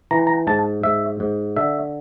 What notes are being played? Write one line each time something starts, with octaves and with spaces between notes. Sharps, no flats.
E3 A#5
A#5
G#2 A5
G#2 E5
G#2
D3 E5